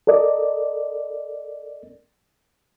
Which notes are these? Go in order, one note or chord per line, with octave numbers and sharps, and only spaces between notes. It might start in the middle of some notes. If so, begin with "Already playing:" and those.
A4 A#4 D5 D#5